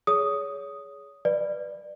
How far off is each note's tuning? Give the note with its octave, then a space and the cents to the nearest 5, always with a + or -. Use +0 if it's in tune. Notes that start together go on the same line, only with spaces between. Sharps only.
G#4 +10 C#5 +30 D#6 +0
B4 +0 D5 +20